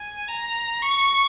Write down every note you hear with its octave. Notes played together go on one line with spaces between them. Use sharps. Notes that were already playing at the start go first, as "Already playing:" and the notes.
Already playing: G#5
A#5
C#6